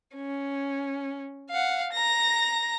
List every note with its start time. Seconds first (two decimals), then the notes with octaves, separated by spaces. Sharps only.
0.16 C#4
1.50 F5 F#5
1.93 A#5 A#6